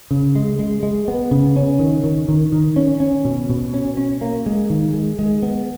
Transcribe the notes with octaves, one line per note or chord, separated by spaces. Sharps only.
C#3
G#3
G#3
G#3
B3
C#3
C#4
D#3
D#3
D#3
D#3
C#4
C#4
B2
B2
C#4
C#4
A#3
G#3
D#3
G#3
G#3
B3